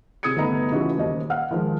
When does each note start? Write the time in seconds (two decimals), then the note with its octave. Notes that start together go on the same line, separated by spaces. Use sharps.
0.23 C3 G#4 D#6 G#6 C#7
0.36 G1 A3 B3 D#4 A#5 B5
0.71 C#3 E3 D#4 F4 F#4
0.97 D#1 D#2 D#5
1.30 F5 F#5 F6
1.51 D#3 F3 G#3